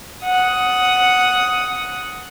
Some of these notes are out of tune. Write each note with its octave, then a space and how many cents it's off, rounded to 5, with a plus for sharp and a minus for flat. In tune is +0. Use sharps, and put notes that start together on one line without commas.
F#5 +0 D#6 +10